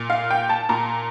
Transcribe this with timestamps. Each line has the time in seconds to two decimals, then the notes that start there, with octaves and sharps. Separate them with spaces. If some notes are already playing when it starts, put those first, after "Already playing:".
Already playing: A#2
0.10 F5
0.30 G5
0.49 A5
0.69 A#2 A#5